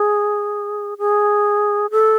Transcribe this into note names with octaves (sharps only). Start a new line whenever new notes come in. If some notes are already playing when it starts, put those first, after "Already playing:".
Already playing: G#4
G#4
A4